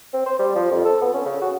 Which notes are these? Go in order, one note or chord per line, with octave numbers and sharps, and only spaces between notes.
C4
C5
G3
F3
F2
A4
B3
C#4
C#3
F#4